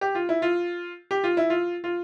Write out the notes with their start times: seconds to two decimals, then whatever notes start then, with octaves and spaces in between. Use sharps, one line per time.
0.01 G4
0.15 F4
0.29 E4
0.42 F4
1.11 G4
1.24 F4
1.37 E4
1.50 F4
1.84 F4